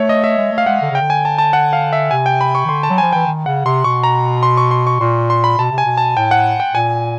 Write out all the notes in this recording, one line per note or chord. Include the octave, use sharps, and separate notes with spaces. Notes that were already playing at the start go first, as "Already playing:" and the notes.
Already playing: A3 C#5
D#5
E5
G#3
A3
F5
G#3 F#5
D3
C#3 G5
D3
G#5
A5
A5
F#5
F5
E5
C3 G#5
G5
B5
C#6
D#3
D3 C6
A5
F#3
F3 G#5
E3 G5
D#3
C#3 F#5
C3 C6
B2 C#6
A#5
C6
C#6
C6
C#6
A#2 C6
C6
B5
B2 A5
C3
G#5
B2
A5
A2 G5
F#5
G5
A#2 G#5